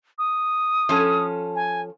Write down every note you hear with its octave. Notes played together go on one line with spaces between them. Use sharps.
D#6
F3 C#4 A4
G#5